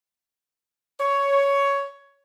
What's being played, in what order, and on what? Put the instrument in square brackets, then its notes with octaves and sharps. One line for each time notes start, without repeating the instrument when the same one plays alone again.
[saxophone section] C#5